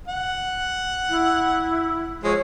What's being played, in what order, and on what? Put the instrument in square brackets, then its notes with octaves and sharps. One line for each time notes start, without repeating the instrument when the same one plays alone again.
[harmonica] F#5
[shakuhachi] E4
[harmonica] F3 G#3 [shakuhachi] C#5